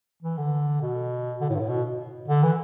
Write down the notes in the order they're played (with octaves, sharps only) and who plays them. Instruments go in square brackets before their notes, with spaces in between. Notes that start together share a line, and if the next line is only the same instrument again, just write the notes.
[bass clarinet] E3
D3
B2
D3
A2
G2
A2
B2
D3
E3